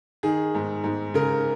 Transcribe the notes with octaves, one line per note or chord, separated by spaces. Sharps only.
D#3 G#4
G#2
G#2
C#3 A#4